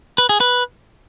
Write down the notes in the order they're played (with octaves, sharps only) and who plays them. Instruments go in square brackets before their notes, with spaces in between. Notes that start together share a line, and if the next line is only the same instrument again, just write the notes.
[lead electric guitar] B4
G#4
B4